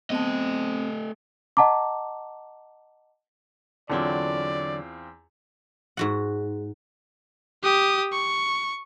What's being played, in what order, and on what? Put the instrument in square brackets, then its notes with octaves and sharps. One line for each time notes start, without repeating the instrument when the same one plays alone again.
[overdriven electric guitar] A3 D#5 [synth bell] B3 A5 [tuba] C4
[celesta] D#5 F#5 A5 A#5 D6
[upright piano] E2 C4 F4 [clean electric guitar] D3 F#3 [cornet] D5
[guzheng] G#2 F#4 F#5
[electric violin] G4 D#6
C#6